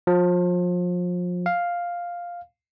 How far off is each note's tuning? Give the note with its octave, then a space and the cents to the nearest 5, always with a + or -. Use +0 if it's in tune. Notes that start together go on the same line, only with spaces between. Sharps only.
F3 +30
F5 +0